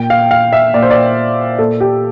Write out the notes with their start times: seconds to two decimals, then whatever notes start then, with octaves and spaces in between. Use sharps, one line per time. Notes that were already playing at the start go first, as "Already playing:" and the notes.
Already playing: A#2 G5
0.10 F5
0.31 F5
0.53 E5
0.74 A#2 D5
0.83 C5
0.90 D5
1.59 A#2 A4
1.80 G4